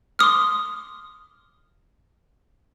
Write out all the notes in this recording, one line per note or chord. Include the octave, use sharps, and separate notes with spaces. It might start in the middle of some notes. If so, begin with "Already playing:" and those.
C6 D6 D#6 F6